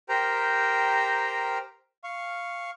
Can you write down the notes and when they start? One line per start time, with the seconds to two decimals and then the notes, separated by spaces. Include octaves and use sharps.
0.09 G4 A#4 C5 G5 A#5
2.04 F5 C#6